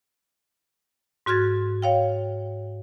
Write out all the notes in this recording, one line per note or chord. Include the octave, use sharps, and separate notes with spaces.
G#2 F#4 F6 G#6 A6
C#5 F5 G5